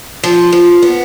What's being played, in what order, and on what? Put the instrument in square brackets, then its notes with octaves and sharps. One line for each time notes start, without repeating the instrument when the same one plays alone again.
[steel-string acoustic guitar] F3
F3
B3